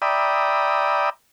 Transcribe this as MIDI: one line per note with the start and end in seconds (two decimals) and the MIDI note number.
0.02 1.10 74
0.02 1.10 76
0.02 1.10 79
0.02 1.10 82
0.02 1.10 83
0.02 1.10 87